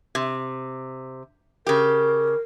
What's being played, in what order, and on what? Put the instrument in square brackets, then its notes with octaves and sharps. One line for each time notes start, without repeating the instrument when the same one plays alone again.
[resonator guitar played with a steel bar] C3
[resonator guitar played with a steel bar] C#3 G4 [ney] A#4